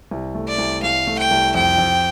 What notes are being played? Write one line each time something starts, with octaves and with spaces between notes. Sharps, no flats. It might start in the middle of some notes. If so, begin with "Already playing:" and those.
C2
A3
D5
C2
C2 F5
A3
G5
C2
F2 G5
F2